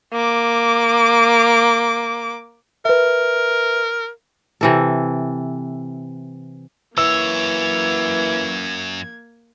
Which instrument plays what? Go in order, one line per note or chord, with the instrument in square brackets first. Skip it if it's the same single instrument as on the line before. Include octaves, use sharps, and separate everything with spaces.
[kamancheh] A#3 D6
[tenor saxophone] A#4 [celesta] B4 E5
[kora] C3 E3 A4
[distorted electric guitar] F#2 C#5 [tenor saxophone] E3 [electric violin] A#3 G#6 [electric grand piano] E6